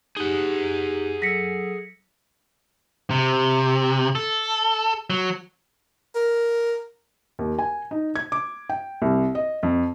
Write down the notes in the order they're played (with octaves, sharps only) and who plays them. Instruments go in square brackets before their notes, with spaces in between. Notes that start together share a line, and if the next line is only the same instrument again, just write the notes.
[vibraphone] D#4 G4 [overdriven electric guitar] G#4 F#5
[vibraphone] F#3 A4 E6 [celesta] A#6 B6 C#7
[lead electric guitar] C3
A4
F#3
[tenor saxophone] A#4
[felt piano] D#2
G#5
D#4
G#6
D6
G5
C2
D#5
F2